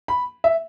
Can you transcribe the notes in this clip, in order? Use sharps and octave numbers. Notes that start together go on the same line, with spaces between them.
B5
E5